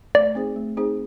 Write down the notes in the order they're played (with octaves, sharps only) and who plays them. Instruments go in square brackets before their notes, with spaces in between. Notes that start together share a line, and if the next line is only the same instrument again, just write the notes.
[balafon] A3 [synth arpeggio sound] D5
[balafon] C4 D#4 G#4 C5
A3
C4 D#4 G#4 C5